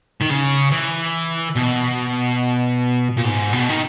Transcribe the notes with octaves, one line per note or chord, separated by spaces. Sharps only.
D#3
C#3
E3
B2
A#2
G#2
B2
D#3